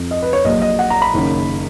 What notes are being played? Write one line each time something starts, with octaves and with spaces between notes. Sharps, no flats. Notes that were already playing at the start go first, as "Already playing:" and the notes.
Already playing: F2 F3
D#5
B4
C#5
A#1 A#2 F#3 D#5
D#5
F#5
A#5
B5
F#1 F#2 D#3